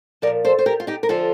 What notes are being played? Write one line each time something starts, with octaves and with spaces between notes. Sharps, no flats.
A#2 F3 A#4 D5
A4 C5
C5
G4 A#4
F4
D#4 G4
A#4
D3 F3 F4 A4